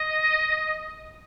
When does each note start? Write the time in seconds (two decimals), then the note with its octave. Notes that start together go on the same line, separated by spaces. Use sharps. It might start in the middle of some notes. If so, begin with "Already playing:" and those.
Already playing: D#5